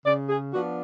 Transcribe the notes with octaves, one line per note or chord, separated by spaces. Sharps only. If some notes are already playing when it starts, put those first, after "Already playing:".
C#3 D5
G#4
F3 B3 D4 F#4